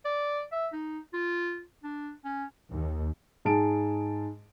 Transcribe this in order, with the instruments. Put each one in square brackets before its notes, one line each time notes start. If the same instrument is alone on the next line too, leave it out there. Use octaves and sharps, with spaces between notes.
[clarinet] D5
E5
D#4
F4
D4
C#4
[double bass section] D#2
[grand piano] G#2 G#4 A5 D7